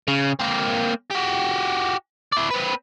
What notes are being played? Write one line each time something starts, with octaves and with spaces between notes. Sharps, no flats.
C#3
A#3 C4
F#4 G4
E4 D5
C4 B4